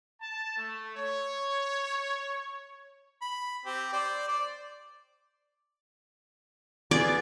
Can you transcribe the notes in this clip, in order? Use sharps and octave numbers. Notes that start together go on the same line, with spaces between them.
A5
A3
C#5
B5
C4 G4
C5 D5
D5
B3 F4 G#4 D5